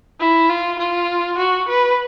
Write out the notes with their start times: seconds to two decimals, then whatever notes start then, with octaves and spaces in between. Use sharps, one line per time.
0.20 E4
0.49 F4
0.79 F4
1.38 F#4
1.69 B4